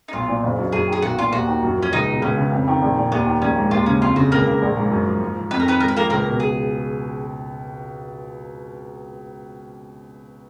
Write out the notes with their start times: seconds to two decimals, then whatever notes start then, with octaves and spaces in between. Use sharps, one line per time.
0.08 D#4
0.13 B1 F4
0.28 A#2
0.43 F#1
0.58 F#2
0.73 F#2 G#4
0.88 D#3 G#4
1.02 B1 F#4
1.18 A#2 F4
1.33 D#2 F#4
1.47 D#3
1.63 F#2
1.78 F3 C#4
1.92 C#2 D#4
2.08 B2
2.22 C#2 C#4
2.37 C#3
2.52 F2
2.68 D#3
2.81 A#1
2.96 A#2
3.12 D#2 B3
3.26 D#3
3.42 A#1 C#4
3.56 G#2
3.71 D#2 F4
3.86 C#3 C#4
4.01 F2 F4
4.16 C#3 F#4
4.32 C#2 A#3 A#4
4.47 C#3
4.62 A#1
4.77 G#2
4.90 F#2
5.06 F3
5.21 G#2
5.36 F3
5.51 F2 B4
5.60 A#4
5.65 D#3 B3 B4
5.80 G#2 A#4
5.88 B4
5.96 F3 A#3 A#4
6.10 C#2 A#3 A#4
6.26 B2
6.40 G#4